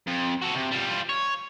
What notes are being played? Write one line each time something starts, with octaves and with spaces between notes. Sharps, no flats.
F2
F#4 A4
C3
G3 F4
C#5